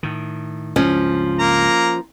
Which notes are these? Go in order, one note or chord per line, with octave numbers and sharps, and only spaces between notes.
A2 D#3
C#2 G2 F3 C#4
A#3 A#5